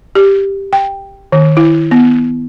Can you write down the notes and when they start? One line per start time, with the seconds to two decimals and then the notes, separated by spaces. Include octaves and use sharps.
0.15 G4
0.73 G5
1.32 D#3
1.57 E4
1.91 B3